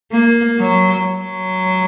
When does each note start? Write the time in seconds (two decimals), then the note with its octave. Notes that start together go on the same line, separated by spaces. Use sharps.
0.12 A#3
0.59 F#3
1.06 F#3